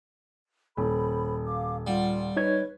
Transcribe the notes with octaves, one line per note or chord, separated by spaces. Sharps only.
D#1 A4 C5 B5
F5 D6
G3 F4 F5 F#5
D#4 B4 C#5 G#6